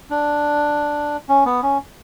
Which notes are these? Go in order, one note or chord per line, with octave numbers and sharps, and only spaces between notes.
D4
C#4
B3
C#4